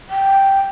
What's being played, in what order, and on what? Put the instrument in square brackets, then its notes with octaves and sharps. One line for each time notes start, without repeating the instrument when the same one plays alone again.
[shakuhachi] G5